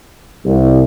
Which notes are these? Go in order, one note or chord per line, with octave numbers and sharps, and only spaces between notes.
C2